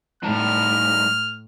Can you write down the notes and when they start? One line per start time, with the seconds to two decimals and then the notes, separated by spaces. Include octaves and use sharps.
0.23 A2 G3 D#4 A5 F6